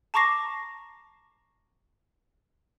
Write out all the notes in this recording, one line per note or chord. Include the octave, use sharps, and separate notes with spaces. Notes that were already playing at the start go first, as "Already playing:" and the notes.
A5 A#5 C#6 D6 A#6 C7